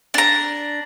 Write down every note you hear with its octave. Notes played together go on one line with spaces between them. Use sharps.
D4 A#5